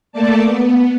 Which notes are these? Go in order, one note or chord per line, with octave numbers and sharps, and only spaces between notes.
A3 A#3 D5 A5
B3